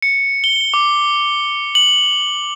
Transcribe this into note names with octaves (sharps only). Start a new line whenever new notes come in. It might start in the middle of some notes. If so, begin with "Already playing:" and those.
C#7
G7
D6
F#7